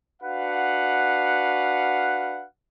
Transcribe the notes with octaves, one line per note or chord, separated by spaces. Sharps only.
D4 F#4 B4 F5 F#5